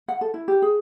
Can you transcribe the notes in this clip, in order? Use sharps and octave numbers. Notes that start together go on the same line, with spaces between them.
F#5
A4
E4
G4
G#4